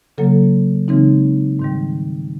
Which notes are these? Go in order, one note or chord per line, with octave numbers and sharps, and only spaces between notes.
C#3 F#3 A#3 A4
C#3 E3 G#3 C4 D#4
G#2 D#3 G3